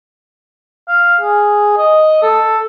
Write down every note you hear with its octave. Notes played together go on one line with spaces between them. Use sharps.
F5
G#4
D#5
A4